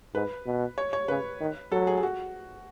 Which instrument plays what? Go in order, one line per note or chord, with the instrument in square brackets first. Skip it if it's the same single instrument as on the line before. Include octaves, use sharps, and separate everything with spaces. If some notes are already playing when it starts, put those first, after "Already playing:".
[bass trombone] G#2 [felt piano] B4
[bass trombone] B2
[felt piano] C#5
C#5
[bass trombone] C#3 [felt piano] B4
[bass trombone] D#3
[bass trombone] F#3 [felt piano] A4
[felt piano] G#4
G#4
F#4